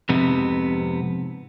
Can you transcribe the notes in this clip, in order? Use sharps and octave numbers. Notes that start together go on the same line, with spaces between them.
F2 G#2 C3 B3